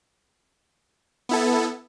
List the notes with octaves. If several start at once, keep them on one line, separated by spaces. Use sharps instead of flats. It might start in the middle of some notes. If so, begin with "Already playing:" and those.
B3 E4 A4